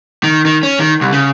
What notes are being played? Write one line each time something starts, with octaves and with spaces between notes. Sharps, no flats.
D#3
D#3
C#4
D#3
C2
C#3